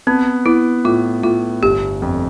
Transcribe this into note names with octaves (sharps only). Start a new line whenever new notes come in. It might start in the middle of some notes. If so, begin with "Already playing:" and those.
B3 C4
B3 E4
A2 F4
A2 F4
G1 G4
F2